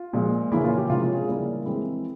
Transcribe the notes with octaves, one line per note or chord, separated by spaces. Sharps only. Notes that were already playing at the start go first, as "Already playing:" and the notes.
Already playing: F4
A#2 F3 G#3
C#3 E3 A#3 C#4 E4
F4
G4
C3 F3 G#3 C#4 F4
F4
G#4
C#3 G3 A#3 E4 A#4
E3 G#3 C4 E4